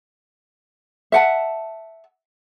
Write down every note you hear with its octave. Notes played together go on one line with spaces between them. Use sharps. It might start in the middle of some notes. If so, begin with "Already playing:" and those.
E5 F#5 A5